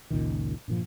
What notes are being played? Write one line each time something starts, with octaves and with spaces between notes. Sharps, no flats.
F#1 C#2 A#2 D#3
G2 A#2 F3